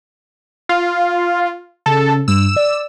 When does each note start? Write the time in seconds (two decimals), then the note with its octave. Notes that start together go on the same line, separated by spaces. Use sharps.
0.69 F4
1.86 C#3 A4
2.28 G2 E6
2.56 D5